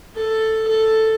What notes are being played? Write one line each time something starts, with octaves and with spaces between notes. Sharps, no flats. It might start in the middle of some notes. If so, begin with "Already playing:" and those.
A4
A4